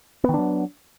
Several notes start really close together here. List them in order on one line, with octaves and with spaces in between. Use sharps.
B3 D#3 D4 F#3